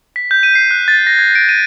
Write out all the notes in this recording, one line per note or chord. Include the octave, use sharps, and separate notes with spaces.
B6
G6
D#7
C7
F#6
A6
A#6
G#6
D7
D#7